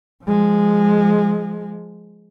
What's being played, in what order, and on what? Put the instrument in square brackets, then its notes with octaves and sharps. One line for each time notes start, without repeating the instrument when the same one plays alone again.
[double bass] F3 G#3